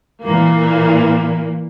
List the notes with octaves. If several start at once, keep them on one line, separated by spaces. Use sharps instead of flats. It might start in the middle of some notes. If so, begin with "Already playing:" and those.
A#2 E3 A#3